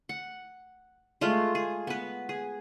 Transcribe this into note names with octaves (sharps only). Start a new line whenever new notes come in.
F#5
G#3 A3 F4
G#4
B3 B4
G#4